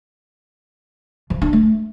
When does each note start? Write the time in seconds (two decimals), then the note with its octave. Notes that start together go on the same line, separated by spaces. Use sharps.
1.30 F3
1.42 D4
1.53 A3